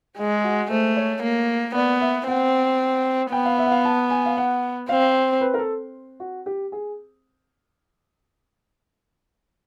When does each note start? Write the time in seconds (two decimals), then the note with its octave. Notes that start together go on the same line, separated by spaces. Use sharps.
0.18 G#3 G#4
0.44 F#4
0.70 A3 C5
0.97 C#5
1.23 A#3
1.75 B3 D5
2.01 E5
2.28 C4 F#5
3.32 B3 G5
3.46 F5
3.58 E5
3.66 F#5
3.72 F5
3.85 A5
4.10 G#5
4.26 F5
4.37 F#5
4.89 C4 F5
5.41 B4
5.54 A#4
5.58 A4
6.20 F#4
6.46 G4
6.72 G#4